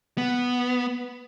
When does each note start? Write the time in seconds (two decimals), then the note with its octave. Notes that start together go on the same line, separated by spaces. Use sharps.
0.18 B3